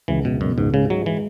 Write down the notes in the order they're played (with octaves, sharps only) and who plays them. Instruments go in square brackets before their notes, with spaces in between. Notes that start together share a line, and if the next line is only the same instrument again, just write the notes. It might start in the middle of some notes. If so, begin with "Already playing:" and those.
[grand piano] C#2 [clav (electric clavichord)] E3
[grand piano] C#2 [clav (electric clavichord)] B2
[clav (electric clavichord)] F#2 [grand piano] B2
[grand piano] C#2 [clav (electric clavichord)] G#2
[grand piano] G#2 [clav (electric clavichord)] C#3
[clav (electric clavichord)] F#3 [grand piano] G#3
[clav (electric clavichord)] E3 [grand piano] G#3